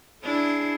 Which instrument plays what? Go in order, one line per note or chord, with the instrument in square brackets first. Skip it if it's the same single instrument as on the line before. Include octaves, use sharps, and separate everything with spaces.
[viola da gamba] D4 E4 [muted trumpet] G#4